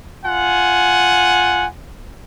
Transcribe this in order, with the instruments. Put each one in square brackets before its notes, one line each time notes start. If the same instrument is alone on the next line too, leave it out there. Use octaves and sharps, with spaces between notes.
[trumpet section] F4 F#5 G#5